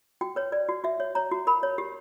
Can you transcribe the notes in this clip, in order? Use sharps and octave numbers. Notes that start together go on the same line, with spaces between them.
F#4 G5
B4 C#5
B4 D5
F#4
F#4 E5
C#5
C#5 A#5
F#4
A#4 B5
C#5
G4